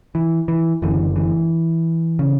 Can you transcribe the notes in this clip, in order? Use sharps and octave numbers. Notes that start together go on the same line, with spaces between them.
E3
E3
F#1 F#2 D3 E3
E3
C#3